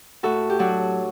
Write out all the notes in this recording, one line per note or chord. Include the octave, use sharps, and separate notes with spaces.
A2 F#4 A4
G4
F#3 D4 F#4